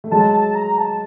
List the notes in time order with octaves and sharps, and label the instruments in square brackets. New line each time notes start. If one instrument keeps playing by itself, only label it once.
[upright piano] A3
[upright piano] F#3 G#3 [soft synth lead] A5
[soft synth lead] A5
A#5
A5